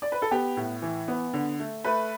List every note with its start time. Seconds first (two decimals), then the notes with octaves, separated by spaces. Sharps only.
0.02 D5
0.12 B4
0.22 A4
0.31 B3 G4
0.57 A2
0.82 E3
1.08 B3
1.33 D3
1.59 A3
1.84 A3 B4